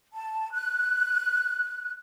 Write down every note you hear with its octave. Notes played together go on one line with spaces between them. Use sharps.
A5
F#6